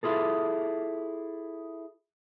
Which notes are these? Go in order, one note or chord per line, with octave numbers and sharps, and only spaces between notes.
E4 F4 G#4 A4